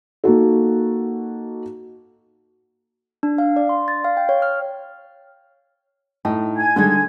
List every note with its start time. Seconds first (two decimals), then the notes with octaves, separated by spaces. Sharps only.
0.24 A#3 D#4 F#4 A4
3.23 D4
3.38 F5
3.56 D5
3.69 C6
3.88 A6
4.04 F5
4.17 G5
4.29 C#5
4.42 F6
6.25 A2 D#4
6.57 G#5 G#6
6.76 D3 D#3 G3 G#3